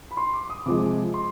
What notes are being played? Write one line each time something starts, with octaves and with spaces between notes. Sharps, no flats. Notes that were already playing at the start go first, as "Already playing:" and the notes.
B5
C6
D6
D#6
C3 F3 G#3 D6
C6